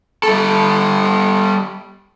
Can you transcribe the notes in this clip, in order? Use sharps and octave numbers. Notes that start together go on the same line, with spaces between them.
G3 A4